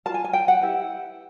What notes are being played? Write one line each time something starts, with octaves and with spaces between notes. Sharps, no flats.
F4 A#4 A5
G#5
G#5
G5
F#5
E4 G4 B4